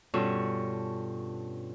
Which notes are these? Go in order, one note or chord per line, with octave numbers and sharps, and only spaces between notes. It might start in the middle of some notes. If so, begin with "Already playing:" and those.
G2 B2 C#4 F4 A4 C#6